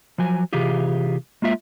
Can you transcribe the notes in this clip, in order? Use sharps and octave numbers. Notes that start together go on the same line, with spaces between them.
F3 F#3 G#5
C3 E3 F4 G4 G#4
G#3 A#3 F4 E5